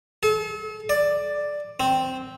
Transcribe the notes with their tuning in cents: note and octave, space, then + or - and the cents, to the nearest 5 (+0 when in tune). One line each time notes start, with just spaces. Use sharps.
A4 -40
D5 +5
C4 -5